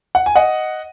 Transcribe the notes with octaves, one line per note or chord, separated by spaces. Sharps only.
F#5
G#5
D#5 F#5